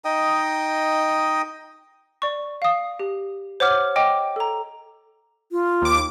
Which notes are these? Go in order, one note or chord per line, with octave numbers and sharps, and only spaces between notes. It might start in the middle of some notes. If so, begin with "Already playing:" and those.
D#4 D#5 G5 D#6
D5 C#6
F5 D#6
G4
C5 C#5 F#5 D6 F6
D#5 G5 D6
A4 A#5
F4
D#2 D6